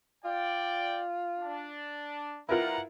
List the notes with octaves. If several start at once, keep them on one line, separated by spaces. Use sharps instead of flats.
F4 D5 G5
D4
G3 E4 F4 A#4 B4 F#5 A#5